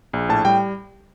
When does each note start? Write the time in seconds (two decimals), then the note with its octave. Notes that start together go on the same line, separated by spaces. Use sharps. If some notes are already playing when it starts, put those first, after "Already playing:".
0.13 A#1
0.29 A2 A5
0.45 G3 G5